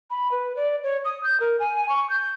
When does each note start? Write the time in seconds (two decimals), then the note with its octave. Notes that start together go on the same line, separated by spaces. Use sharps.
0.10 B5
0.32 B4
0.56 D5
0.83 C#5
1.05 D#6
1.24 G6
1.40 A#4
1.60 G#5
1.89 C#6
2.10 G6